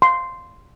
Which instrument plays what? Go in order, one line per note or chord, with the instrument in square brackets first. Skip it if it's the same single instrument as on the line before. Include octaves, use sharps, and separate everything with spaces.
[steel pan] C6